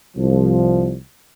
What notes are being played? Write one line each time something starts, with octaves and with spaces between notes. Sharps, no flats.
C2 F3